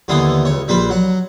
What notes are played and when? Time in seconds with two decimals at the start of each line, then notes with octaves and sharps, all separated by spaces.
0.08 D#2 D3 E3 B3 C6 D#6
0.45 C#2 C#5
0.68 A#1 G3 B4 C5 B5
0.90 F#3 F#5